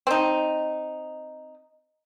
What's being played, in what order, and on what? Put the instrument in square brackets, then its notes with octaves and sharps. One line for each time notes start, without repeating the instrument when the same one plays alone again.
[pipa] C4 D#4